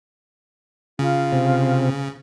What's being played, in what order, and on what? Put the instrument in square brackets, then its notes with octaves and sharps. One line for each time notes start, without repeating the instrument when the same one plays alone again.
[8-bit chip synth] C#3 [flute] F4
[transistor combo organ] C3